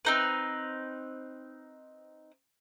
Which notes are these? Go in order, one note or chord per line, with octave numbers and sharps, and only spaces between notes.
C4 D#4 B4